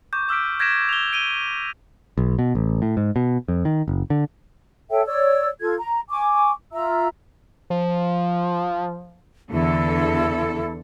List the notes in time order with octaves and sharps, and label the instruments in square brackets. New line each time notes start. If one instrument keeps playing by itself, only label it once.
[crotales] C#6 D6 G6
D6 E6 F6 B6 D7
G6 G#6 A#6 B6 D7 E7
F7 G7
D7 D#7 G7
[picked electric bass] B1
B2
A1
A2
G#2
B2
F2
D#3
F#1
D3
[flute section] A4 C#5 E5 G5
C#5 D5 E6
F4 A4 G#6
A#5
G#5 C#6 D6
F4 E5 A#5 E6
[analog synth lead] F3
[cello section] E2 D3 A4 [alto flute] E4